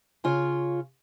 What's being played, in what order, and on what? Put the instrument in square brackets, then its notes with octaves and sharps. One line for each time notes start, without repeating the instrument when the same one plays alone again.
[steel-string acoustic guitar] C#3 F4 C#5